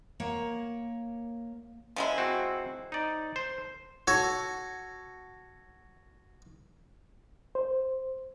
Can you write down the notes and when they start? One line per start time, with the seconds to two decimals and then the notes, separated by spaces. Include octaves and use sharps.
0.20 A#3 C#5 F#5
1.96 F3 G#3 E4
2.18 C4 F#4
2.92 D#4 D5
3.36 C5
4.08 F#4 A4 C#5
7.55 C5